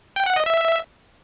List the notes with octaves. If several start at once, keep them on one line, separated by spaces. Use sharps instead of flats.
G5
F#5
D#5
E5